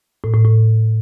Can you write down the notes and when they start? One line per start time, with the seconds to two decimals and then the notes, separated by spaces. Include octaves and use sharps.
0.24 A2
0.34 A2
0.45 A2